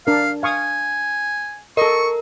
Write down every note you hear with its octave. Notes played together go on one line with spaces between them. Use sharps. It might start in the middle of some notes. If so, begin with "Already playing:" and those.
D4 A#4 F5
F5 G#5 C#6 D#6
A4 A#4 D#5 C#6